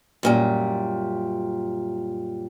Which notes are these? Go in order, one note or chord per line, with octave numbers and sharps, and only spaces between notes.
F#2 A#2 G3